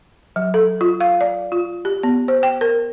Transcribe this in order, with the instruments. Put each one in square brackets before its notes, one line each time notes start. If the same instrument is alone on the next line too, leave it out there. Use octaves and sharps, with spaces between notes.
[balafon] F#3
A4
F4
F5
D5
F4
G4
B3
C5
G5
A#4